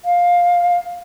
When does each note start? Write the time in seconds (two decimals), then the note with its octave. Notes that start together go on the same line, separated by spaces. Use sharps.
0.05 F5